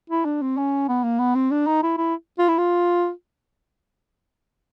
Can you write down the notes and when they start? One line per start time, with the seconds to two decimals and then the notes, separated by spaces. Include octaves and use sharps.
0.10 E4
0.25 D4
0.41 C4
0.57 C#4
0.88 B3
1.04 A#3
1.19 B3
1.35 C4
1.51 D4
1.67 D#4
1.83 E4
1.98 E4
2.39 F4
2.49 E4
2.58 F4